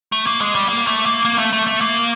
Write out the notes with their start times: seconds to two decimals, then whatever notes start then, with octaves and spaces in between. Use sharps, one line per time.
0.12 A3
0.26 A#3
0.41 G#3
0.55 G3
0.69 A#3
0.87 A3
1.06 A#3
1.25 A#3
1.38 A3
1.53 A3
1.67 A3
1.81 A#3